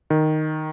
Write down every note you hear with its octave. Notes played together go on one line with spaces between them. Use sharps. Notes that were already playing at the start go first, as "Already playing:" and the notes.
D#3